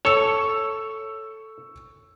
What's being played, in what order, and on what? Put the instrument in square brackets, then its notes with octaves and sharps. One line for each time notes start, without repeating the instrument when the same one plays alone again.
[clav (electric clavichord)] A4 C#5 [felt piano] C#6 E6